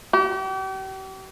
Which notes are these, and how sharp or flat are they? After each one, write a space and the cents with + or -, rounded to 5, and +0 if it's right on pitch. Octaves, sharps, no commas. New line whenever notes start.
G4 -40